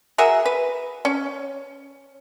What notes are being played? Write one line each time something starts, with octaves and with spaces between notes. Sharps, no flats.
F#4 G#4 A#4 E5
B4
C#4